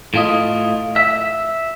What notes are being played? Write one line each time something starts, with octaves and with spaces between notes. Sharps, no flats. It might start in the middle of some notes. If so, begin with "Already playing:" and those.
A2 F4 D#5
E5